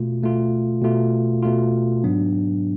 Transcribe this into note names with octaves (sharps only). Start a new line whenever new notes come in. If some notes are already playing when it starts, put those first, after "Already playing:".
Already playing: B2 A3 F4
B2 A3 F4
B2 A3 F4
B2 A3 F4
G#2 F#3 B3 D4